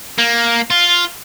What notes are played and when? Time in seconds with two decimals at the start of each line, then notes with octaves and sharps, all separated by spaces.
0.18 A#3
0.70 F4